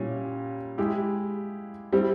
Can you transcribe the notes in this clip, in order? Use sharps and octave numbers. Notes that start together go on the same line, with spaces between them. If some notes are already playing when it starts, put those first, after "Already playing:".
Already playing: A#2 G3 C#4 E4
G#3 E4 G4
G3 C4 E4 G4